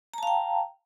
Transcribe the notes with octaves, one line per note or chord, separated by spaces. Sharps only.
F5 G5 A5 A#5